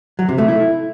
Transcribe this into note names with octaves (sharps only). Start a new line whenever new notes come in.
F#3
C3
A3
E4